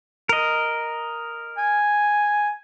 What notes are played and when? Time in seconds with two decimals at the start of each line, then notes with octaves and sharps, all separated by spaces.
0.29 A#4 D#5
1.58 G#5